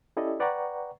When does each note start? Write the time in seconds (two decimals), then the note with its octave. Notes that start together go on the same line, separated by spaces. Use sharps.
0.17 C#4 E4 G4 A4 D5 D#5
0.40 B4 D5 F#5 G5 A#5 C#6